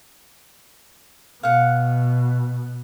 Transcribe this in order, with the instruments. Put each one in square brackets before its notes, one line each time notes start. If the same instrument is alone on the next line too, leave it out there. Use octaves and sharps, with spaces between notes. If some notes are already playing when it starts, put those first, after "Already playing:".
[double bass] B2 [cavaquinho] F5 F#5